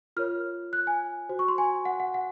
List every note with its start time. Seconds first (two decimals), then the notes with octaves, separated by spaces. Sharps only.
0.16 F4 A#4 C#5 F6
0.73 F#6
0.87 G#5
1.29 F#4 C5
1.39 C#6
1.48 C6
1.58 G#5
1.85 F#5
2.00 F#5
2.14 F#5